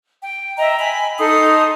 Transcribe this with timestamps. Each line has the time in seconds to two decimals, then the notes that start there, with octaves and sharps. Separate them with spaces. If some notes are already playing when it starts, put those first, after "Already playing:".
0.22 G5
0.58 D#5 E5 G5 A#5
0.79 G#5 B5
1.19 D#4 A4 C6 D#6